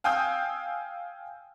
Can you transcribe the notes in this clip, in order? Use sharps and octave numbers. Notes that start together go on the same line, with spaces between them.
F5 G5 G#5 D#6 E6 G6